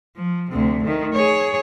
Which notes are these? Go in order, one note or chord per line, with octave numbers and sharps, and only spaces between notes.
F3
D2 C3
D#3 A3
G#4 C#5